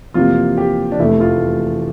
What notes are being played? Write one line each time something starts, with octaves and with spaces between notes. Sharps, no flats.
F2 C3 E3 A#3 F4
G4
D4
F1 E2 E3 A3 E4
F4